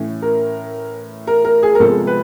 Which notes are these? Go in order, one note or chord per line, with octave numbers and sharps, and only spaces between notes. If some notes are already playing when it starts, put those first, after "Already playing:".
Already playing: A2 E3 A3 C#4
A#4
A#4
A#4
G#4
A#4
C3 F3 G#3 B3 A4
B4